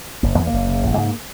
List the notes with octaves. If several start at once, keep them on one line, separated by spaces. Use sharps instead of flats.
F#1 A#3
E2 B3
A#3
F#1
C#3
A1
G#2